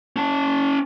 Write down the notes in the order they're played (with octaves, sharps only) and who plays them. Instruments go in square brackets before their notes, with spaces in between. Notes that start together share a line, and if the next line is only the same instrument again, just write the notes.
[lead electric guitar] C#4 A5